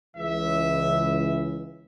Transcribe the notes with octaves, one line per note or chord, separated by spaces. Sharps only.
C#2 E3 E5